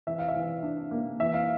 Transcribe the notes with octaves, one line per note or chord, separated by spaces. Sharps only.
E3 E5
F5
E5
E3
D4
A#3
E3 E5
F5